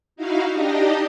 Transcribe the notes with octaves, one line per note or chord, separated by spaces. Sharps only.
D#4 E4 F#4 F5
D4 D#4 G4 D#5